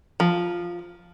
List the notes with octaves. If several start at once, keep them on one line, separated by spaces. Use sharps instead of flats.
F3